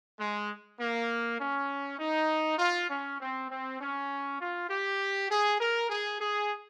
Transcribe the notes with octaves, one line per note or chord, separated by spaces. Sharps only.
G#3
A#3
C#4
D#4
F4
C#4
C4
C4
C#4
F4
G4
G#4
A#4
G#4
G#4